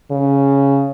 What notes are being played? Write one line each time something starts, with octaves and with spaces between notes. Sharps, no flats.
C#3